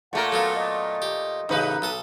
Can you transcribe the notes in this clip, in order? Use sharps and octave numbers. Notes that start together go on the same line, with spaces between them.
A#2 A3 A#4 F#5
F#3 B3 F4 A4
D#5
G4
A1 C#3 D#4 B4
B1 A4 D#6